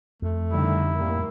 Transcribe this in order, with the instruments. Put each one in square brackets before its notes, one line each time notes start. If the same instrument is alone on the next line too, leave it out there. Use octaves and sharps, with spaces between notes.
[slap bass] F2 [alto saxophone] A3
[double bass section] D3 D#3 G3 [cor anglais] E4
[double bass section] A2 A#3 [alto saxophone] G3